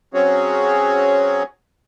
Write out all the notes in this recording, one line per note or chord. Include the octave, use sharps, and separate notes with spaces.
F#3 C4 C#4 F#4 G#4 C#5